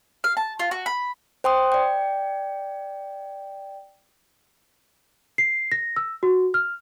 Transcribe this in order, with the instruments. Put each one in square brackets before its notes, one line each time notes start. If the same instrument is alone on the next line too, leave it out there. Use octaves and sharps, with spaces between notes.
[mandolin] F5
A5
F4
F#4
B5
[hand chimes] C5 G5 C6 D#6
D5 G5
[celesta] C7
A#6
E6
F#4
F6